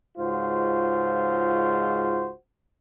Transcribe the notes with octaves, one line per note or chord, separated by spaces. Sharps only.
C#2 G#2 F4 F#4 C5